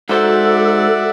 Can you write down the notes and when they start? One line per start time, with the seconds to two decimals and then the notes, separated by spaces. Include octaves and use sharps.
0.09 G#2 F#4 A4 C5 D5 E5 F#5